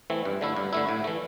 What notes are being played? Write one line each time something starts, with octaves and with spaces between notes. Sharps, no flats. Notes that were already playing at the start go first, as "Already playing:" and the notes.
E3 A3 C4
G2
D3 A3 E4
G2
D3 A3 E4
A2
E3 A3